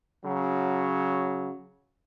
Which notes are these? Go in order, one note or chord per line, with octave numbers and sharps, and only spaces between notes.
C#3 F#3